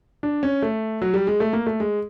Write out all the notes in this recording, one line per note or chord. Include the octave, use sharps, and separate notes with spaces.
D4
C#4
A3
F#3
G3
G#3
A3
A#3
A3
G#3